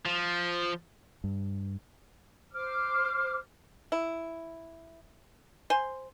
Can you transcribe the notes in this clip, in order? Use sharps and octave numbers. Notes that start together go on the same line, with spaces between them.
F3
G2
C5 D6 F6
E4
C5 G#5 C6